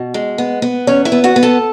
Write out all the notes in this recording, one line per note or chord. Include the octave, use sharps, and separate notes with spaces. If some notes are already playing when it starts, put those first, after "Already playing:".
Already playing: B2
G#3
B3
B3
E2 C#4 C#5
E4 E5
B3
F#4 F#5
B3
A4 A5